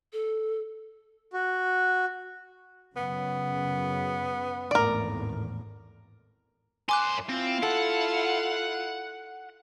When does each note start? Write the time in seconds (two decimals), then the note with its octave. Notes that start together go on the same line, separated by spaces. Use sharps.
0.13 A4
1.33 F#4
2.96 F#2 C#3 B3
4.71 G#1 E2 A2 A#4 D5
6.89 F#2 G#5 C6 D6 F#6
7.29 C4 E4 F4
7.63 A4 F#5